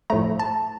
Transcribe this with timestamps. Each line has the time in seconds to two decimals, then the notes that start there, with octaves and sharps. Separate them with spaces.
0.10 A2 F3 A3 A#5
0.39 A5